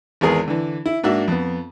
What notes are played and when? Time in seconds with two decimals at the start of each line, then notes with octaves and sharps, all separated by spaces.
0.21 G#1 E2 G#3 B3 G#4 A#4
0.48 D3 E3
0.86 E4
1.04 G#2 A#3 D4 F#4 E5
1.28 F2 B3